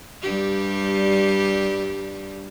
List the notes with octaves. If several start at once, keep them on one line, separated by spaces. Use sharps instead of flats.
G2 G3 G4